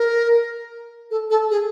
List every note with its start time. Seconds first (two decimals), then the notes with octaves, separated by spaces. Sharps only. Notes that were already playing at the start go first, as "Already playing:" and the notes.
Already playing: A#4
1.11 A4
1.30 A4
1.51 G#4